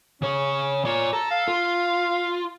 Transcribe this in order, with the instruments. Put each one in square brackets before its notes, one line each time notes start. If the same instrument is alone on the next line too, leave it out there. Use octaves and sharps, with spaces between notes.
[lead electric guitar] C#3 C#5 [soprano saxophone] C#4
[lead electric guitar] F4 D5 [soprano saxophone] C#5
[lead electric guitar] A4 [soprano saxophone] A#5
[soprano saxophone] F5
[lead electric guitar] F4